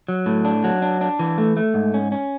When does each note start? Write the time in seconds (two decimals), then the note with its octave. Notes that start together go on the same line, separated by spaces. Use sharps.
0.08 F#3
0.26 A2
0.45 D4
0.64 F#3
0.82 D4
1.01 D4
1.19 E3
1.38 A3
1.57 A3
1.74 G#2
1.94 C#4
2.12 C#4